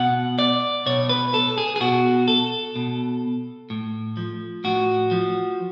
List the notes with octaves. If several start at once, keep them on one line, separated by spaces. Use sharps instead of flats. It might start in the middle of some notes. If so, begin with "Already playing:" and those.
Already playing: B2 F#5
D5
B2 C#5
B4
A4
G#4
G#4
B2 F#4
A4
B2
A2
F3
A2 F#4
F3